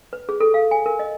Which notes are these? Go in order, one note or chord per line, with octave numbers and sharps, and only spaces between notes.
B4
G#4
A4
F5
G#5
A#4
D#5